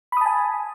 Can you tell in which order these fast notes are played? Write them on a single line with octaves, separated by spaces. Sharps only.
B5 D#6 A5 G#5